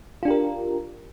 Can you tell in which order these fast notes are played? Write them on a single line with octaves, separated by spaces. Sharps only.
F4 D4 G4 A#4